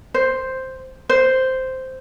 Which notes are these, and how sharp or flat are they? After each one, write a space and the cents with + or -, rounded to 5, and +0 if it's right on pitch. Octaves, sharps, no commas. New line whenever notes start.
C5 +0
C5 -5